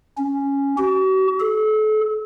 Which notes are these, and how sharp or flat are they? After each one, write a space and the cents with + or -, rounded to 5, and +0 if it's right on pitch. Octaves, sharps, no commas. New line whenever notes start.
C#4 +0
F#4 +40
A4 -35